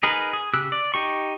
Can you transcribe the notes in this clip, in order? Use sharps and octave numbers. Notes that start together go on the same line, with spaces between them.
D#4 G#4 A#4 B4
G#4
C#3 G4 E6 F#6
D5
D#4 G4 C#6